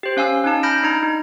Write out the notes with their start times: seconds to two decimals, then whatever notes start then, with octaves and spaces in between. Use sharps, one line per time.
0.03 G4 C5
0.17 C#4 F5 G#5 E6
0.44 C#4 D#4 A5
0.63 B5 F6 G6 A#6 D7
0.83 D4 D#4 A#5
1.03 D#4